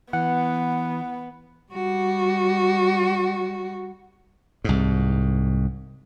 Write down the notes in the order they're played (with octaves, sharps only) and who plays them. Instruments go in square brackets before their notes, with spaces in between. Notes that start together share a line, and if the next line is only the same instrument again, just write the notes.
[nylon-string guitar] E3 [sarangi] B3 [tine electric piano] F#5
[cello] G3 F#4
[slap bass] C2 G#2